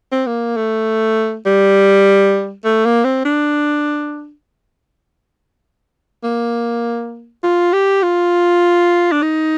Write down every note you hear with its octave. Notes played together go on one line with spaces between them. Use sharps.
C4
A#3
A3
G3
A3
A#3
C4
D4
A#3
F4
G4
F4
D4
D#4